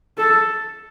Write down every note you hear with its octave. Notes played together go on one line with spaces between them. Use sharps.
A4